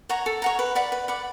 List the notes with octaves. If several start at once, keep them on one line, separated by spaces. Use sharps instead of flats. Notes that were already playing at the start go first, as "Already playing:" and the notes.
C#5 F#5 A#5
A4
C#5 F#5 A#5
B4
D5 F#5 B5
B4
D5 F#5 B5